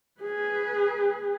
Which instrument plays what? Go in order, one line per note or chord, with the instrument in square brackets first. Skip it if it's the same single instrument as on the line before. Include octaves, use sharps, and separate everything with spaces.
[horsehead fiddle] G#4 B4